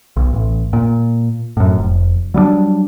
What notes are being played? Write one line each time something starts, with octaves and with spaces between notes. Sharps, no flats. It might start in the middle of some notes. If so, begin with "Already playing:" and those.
B1
A1
A#2
F#2 A2
F1
F#3 G3 A#3 D4